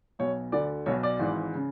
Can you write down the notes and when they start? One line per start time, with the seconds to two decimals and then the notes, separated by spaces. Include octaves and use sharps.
0.19 B1 B2 C#5
0.52 D2 D3 D5
0.86 B1 B2 C#5
1.03 D5
1.19 G#1 G#2 E3
1.55 C#3